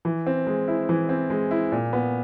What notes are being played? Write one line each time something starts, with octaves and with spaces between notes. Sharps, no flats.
E3
C4
G#3
E4
E3
C4
G#3
E4
A#2
B3